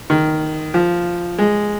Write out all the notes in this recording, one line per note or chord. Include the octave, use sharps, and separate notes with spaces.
D#3
F3
G#3